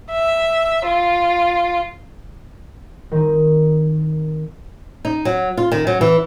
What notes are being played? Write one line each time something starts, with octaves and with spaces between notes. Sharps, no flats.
E5
F4
D#3 C4 D#4
D#4
F#3
F4
D#3
F#3
E3